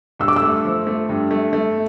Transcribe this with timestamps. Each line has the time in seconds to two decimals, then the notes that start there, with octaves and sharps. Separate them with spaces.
0.19 G2 E6
0.28 D6
0.36 E6
0.42 A3
0.65 F3
0.87 A3
1.09 G2
1.31 A3
1.53 A3